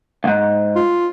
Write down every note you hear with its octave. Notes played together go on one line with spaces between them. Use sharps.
C#2 G#2
F4